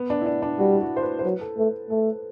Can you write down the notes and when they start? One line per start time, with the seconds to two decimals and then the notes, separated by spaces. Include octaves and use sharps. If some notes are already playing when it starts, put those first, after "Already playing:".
Already playing: B3
0.10 D4
0.21 E4
0.26 D4
0.42 D4
0.59 G3 F#4
0.75 E4
0.81 F#4
0.97 C5
1.03 B4
1.19 C5
1.24 F#3 B4
1.41 A4
1.57 A3 B4
1.90 A3 A4